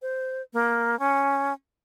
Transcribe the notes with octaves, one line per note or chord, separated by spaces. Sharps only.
C5
A#3
C#4